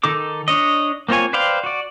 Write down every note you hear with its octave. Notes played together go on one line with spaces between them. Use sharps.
D#3 D#4 A4 D6
D4 C#5 D#5
A#3 C4 F4 C#5 G#5
B4 C5 D5 F5 G5
F#4 D5